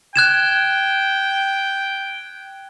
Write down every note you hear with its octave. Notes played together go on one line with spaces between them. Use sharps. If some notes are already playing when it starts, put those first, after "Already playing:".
G5 F#6 G#6 E7